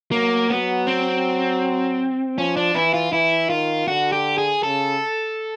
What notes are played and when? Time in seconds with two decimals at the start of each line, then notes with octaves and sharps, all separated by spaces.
0.11 F#3 A#3
0.50 F#3 B3
0.87 C4
2.37 F3 C#4
2.57 D4
2.75 E3 E4
2.94 F4
3.13 E3 E4
3.50 D#3 F4
3.88 D3 F#4
4.12 G4
4.38 G#4
4.63 C#3 A4